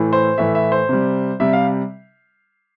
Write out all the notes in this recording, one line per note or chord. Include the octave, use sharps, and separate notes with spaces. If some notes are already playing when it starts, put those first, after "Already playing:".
Already playing: A2 E3 A3
C5
A2 E3 A3 E5
E5
C5
C3 G3
C3 G3 E5
F5